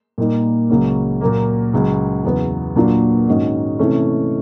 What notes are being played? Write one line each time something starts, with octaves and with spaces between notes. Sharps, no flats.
A#2 G3 A#3 D#4
C#2 C#3 F#3 A#3 C#4
A#2 F#3 A#3
C#2 C#3 F#3
E2 C#3 F#3 B3
A#2 F#3 A#3 D4 F4
G#2 D#3 G#3 C#4 F#4
C3 E3 A3 C#4